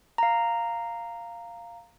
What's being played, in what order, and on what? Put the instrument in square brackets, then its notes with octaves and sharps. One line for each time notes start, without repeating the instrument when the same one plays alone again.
[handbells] F5 A#5